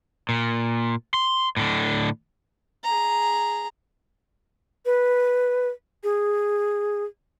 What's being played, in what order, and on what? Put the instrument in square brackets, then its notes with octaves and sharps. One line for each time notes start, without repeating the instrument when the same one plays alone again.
[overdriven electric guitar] A#2
C6
A2 D3
[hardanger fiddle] G#4 A#5
[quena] B4
G#4